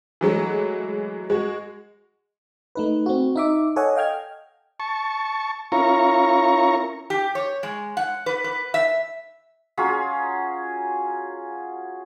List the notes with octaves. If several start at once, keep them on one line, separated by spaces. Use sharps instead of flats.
E3 F#3 G#3 A3
G#3 F#4
A3 D#4 B4
C4 F#4
D#4 E5 D6
A4 C#5 D#5 F#5 G#5
D#5 F5 G5 F6 G#6
A5 C#6
C#4 E4 F4 A#4 A#5 C#6
G4
C#5
G#3
F#5
B4
B4
E5
F#3 C#4 F4 G#4